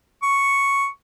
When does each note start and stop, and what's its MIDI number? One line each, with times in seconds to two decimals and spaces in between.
0.23 0.87 85